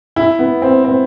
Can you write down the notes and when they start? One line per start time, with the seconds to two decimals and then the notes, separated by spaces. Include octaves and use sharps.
0.16 E4
0.39 B3
0.62 C4
0.85 C4